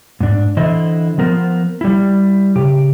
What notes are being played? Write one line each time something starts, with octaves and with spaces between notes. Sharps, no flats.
G#2 D4
D3 E3 E4 C5 D#5
F3 B3 A#4 C5
G3 E4
C#3 G4